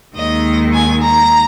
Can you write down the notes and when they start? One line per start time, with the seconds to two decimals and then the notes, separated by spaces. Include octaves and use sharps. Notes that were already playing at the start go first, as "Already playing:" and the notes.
0.14 D#2 D#3 G#3 D#5
0.72 G#5
1.01 A#5